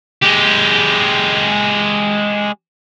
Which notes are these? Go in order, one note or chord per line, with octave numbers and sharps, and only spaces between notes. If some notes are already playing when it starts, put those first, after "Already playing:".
G#3 G4